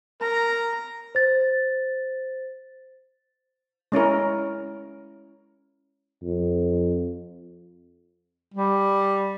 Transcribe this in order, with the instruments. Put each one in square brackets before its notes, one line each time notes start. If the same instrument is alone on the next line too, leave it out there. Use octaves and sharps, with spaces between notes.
[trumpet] A#4 [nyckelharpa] A#5
[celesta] C5 A6
[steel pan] G#3 C#4 E4 A#4
[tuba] F2
[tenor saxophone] G3